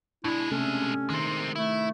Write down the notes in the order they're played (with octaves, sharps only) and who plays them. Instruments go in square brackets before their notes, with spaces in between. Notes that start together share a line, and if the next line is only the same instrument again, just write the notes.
[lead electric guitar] B2 G#3 [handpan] D4 [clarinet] E4
[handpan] C3 A3 A4 [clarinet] C#4
[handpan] D#3 [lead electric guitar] G#3 C4
[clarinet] A3 [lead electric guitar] E4